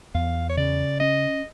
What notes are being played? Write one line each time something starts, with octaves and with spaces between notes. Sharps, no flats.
E2 F5
C#5
C#3 D5
C#4 D#5